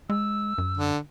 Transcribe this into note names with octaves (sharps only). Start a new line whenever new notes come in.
G#3 E6
F#2
D3